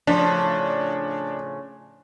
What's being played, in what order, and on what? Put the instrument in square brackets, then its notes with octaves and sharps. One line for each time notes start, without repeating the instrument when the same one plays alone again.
[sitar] A2 C#3 F3 [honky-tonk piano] D4